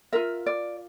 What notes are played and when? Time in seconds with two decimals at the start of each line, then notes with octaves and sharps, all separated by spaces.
0.12 F4 A#4 E5
0.46 D5